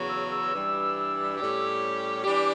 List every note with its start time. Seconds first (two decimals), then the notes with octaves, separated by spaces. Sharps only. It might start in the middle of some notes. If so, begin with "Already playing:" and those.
Already playing: E2 C#3 F#3
0.09 E6
0.31 E6
0.52 G2 E3 G3
1.37 A2 G3 C#4 G4
2.23 E3 G3 D4 G4 D6